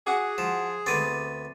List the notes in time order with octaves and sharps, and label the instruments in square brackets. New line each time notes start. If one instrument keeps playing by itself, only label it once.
[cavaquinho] F#4 F#5 [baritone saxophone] G#4 [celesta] G#5 D6
[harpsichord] F3 [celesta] E7
[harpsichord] D2 B3 C4 [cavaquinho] D6 [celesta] A6 D#7